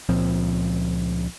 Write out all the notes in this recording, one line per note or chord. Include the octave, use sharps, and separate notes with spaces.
C#2 A#2 F3 C4